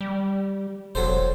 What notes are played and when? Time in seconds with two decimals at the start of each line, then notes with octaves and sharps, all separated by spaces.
0.01 G3
0.95 E1 F#3 A4 C5